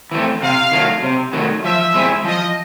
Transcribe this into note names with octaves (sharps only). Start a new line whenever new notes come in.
E3 A3 C4
C3 F5
D#3 F#3 A3
C3
D#3 F#3 A3
F3 E5
G#3 C4 E4 G#4
F3 D#5